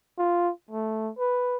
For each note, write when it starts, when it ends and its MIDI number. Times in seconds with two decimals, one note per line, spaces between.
0.18 0.51 65
0.71 1.11 57
1.19 1.57 71